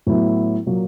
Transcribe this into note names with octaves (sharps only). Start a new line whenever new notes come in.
A2 F#3 B3 E4
A#2 F#3 A#3